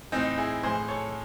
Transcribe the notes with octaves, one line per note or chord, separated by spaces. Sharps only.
A2 E3 C4 D#4
E4 G#4
A2 E3 G#4 C5
A4 C#5